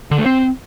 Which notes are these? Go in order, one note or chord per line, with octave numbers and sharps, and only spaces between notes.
D3
A3
C4